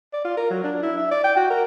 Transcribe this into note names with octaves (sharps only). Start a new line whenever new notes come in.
D5
F4
A#4
F#3
D4
E4
E5
D5
G5
F#4
A#4